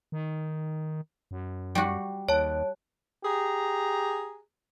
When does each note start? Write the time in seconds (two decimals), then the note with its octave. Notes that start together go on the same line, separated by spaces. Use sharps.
0.12 D#3
1.31 F#2
1.75 G3 F#4
2.29 D#2 C#5 A5
3.23 G4 G#4 A#5